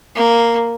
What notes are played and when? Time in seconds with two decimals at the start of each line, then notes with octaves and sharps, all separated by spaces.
0.15 A#3